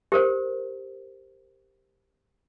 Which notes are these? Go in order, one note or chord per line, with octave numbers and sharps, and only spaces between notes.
G4 A#4 C5